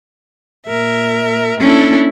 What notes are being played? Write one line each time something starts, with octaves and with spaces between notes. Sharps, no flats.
A#2 A#4 E5
A#3 C#4 D4 E4 A4